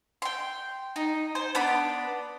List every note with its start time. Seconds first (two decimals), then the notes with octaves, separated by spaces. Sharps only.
0.22 G5 C6
0.96 D#4
1.35 C5
1.55 B3 D4 B5